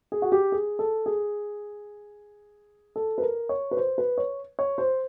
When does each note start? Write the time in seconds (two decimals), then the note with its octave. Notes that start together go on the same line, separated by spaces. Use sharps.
0.12 G#4
0.22 F#4
0.32 G4
0.52 G#4
0.79 A4
1.06 G#4
2.96 A4
3.18 B4
3.22 A#4
3.49 C#5
3.71 B4
3.77 C5
3.98 B4
4.18 C#5
4.59 C#5
4.78 C5